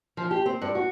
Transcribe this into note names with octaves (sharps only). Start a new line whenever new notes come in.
F3
G4
C4
G2
F#4